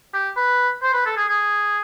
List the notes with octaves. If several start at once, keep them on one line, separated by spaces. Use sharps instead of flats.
G4
B4
C5
B4
A4
G#4
G#4